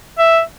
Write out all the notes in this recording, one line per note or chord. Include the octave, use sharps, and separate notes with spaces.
E5